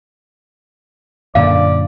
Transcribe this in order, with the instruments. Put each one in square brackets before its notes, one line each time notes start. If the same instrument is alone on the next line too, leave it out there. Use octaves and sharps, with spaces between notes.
[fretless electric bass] F#2 A#2 D3 [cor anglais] D5 [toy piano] F5